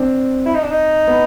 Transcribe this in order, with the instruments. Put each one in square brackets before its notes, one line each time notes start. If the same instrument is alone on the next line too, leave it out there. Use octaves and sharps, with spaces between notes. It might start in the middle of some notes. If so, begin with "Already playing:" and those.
Already playing: [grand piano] C4 D4
[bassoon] E4
D#4
D4
D#4
[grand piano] B3